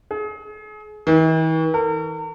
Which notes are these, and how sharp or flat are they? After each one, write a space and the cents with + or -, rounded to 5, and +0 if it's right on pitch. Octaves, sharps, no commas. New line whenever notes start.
G#4 +35
E3 -45
A#4 -40